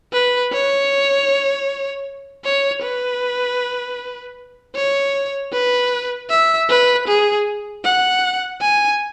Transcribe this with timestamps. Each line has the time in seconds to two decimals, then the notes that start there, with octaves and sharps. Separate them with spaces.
0.13 B4
0.53 C#5
2.45 C#5
2.83 B4
4.76 C#5
5.53 B4
6.30 E5
6.69 B4
7.08 G#4
7.84 F#5
8.61 G#5